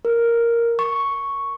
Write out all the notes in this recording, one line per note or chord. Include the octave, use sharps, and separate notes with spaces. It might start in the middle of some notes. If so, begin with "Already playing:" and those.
A#4
C#6